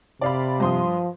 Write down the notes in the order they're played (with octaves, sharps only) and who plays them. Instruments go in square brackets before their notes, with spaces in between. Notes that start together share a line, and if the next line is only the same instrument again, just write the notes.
[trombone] C3 [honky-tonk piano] D5 F5 B5
[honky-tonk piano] G2 C6 D#6 [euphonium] F3